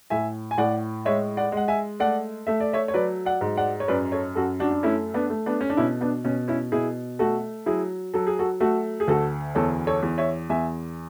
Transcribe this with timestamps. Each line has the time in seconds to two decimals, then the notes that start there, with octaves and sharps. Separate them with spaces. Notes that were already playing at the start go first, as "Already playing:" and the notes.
0.10 A2 E5 G#5
0.51 G#5
0.58 A2 D5 F#5
1.05 G#3 C#5 E5
1.37 D5 F#5
1.52 G#3 F#5
1.68 E5 G#5
2.00 A3 D5 F#5
2.47 A3 E5
2.60 D5
2.73 C#5 E5
2.88 C#5
2.94 F#3 B4 D5
3.25 D5 F#5
3.41 G#2
3.57 D5 F#5
3.80 C#5
3.88 F#2 B4 D5
4.12 A4 C#5
4.35 F#2 F#4 A4
4.60 D4 F#4
4.71 D4
4.83 A3 C#4 E4
5.14 B3 D4
5.30 A3
5.46 B3 D4
5.61 C#4
5.70 D4
5.77 B2 C#4 E4
6.01 B3 D4
6.24 B2 C#4
6.48 C#4 E4
6.72 B2 E4 G#4
7.19 A3 F#4 A4
7.66 F#3 E4 G#4
8.14 F#3 A4
8.27 G#4
8.39 F#4 A4
8.60 A3 F#4 A4
9.00 G#4
9.08 D2 F#4 A4
9.55 E2 A4 C#5
9.87 A4 C#5
10.02 E2
10.18 C#5 E5
10.49 E2 E5 G#5